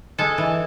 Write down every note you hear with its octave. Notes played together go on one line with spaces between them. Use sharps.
G#3 A4
E3